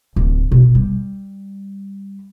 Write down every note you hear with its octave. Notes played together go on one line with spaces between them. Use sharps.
D1
B2
G3